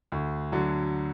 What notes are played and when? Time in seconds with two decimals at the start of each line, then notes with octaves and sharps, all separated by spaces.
0.12 D2
0.52 D3 F#3